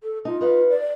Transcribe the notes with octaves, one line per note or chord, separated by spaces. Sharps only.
A4
D#4 F4
D#4 B4 F5
D5